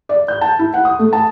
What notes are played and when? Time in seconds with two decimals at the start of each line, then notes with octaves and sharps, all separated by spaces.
0.09 D5
0.28 G6
0.41 A5
0.59 E4
0.74 F#5
0.85 D#6
0.99 A3
1.13 A5